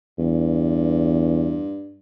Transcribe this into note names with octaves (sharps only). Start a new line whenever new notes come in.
E2 G2